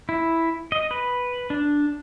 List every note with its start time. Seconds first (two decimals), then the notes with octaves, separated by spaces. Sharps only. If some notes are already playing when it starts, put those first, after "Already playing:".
0.09 E4
0.72 D#5
0.91 B4
1.50 D4